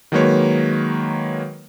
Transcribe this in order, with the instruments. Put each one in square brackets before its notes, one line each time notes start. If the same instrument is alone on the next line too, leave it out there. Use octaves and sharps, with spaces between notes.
[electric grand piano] D#3 F#3 G#3 A#3 B4 C#5